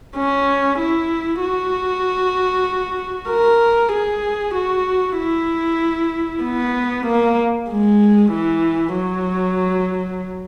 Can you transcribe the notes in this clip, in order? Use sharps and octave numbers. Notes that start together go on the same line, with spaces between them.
C#4
E4
F#4
A#4
G#4
F#4
E4
B3
A#3
G#3
E3
F#3